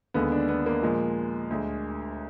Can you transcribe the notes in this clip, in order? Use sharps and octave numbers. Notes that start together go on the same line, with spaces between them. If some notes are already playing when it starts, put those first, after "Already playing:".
D#2 D3 G#3 B3
D4
B3
A#3
A#2 F3 G#3
D2 D3 G#3